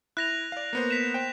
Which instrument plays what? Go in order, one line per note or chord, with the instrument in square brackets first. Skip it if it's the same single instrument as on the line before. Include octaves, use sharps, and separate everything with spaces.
[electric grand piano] E4 [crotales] F#6 A#6 F7
[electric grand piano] D5 F5
A#3 B3 C5
[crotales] B6 E7
[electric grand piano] C5 G5